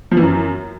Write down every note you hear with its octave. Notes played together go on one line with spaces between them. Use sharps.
F3
E3
F#2